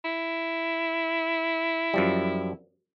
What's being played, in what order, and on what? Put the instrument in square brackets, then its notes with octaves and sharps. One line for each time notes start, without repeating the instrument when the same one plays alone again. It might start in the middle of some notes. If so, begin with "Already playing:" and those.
[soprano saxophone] E4
[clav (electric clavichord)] F#2 F3 G3